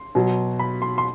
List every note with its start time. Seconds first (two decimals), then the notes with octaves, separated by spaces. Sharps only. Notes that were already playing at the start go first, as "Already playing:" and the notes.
Already playing: C6
0.15 B2 F#3
0.59 B5
0.82 C6
0.98 C6